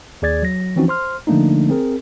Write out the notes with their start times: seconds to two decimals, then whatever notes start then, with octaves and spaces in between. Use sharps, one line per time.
0.22 D#2 G#4 D5 G#6 A6
0.43 F#3 A#6
0.76 E3 F3 C4 C#4 D#4 F#4
0.88 C5 C6 F6
1.27 D3 F3 A3 A#3 D4 D#4
1.70 C4 G#4 A#4